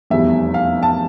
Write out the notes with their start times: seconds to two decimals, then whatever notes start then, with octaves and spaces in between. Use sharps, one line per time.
0.10 F1 E2 B2 G3 E5
0.54 F5
0.83 A5